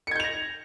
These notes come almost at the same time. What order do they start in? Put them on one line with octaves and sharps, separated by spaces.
C#7 G#6 G6 F7 A#6